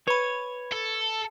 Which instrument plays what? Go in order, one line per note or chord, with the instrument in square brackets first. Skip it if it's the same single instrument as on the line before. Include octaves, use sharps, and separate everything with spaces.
[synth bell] B4 B5 [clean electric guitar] C#5
[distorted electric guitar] A4